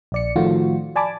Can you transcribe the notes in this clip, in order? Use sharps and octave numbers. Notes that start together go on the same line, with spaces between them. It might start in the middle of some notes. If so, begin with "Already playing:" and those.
A#1 D5 C#7
A2 D#3 F3 A3 F4 F#4
D5 G#5 A5 B5 D6